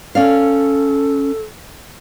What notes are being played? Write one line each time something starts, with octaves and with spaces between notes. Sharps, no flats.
C#4 A4 D5 F5